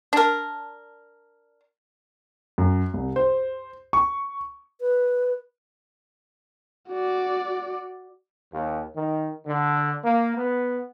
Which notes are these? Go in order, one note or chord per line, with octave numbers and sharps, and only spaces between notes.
D4 A#4
F#2
C2
C5
C#6
B4
F#4 D5
D#2
D#3
D3
A#3
B3